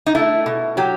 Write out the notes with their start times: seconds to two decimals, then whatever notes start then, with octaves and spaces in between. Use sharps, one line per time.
0.06 D#4
0.15 A3 E4
0.46 B2
0.77 F#3 G4